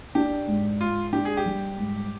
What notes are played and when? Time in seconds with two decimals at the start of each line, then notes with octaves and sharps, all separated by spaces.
0.15 D4 G4
0.47 G#2
0.80 G#2 F4
1.13 D4 G4
1.25 G#4
1.37 G4
1.46 G3
1.78 G#2